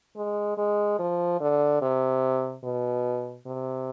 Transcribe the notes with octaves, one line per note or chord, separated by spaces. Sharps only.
G#3
G#3
F3
D3
C3
B2
C3